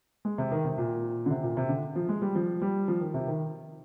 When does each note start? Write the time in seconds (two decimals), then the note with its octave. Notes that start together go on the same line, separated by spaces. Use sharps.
0.25 G#3
0.38 C3
0.51 D#3
0.65 C3
0.78 A#2
1.26 D3
1.30 C3
1.43 A#2
1.57 C3
1.69 D3
1.95 F3
2.09 G#3
2.22 G3
2.35 F3
2.62 G3
2.88 F3
3.01 D#3
3.14 C3
3.27 D#3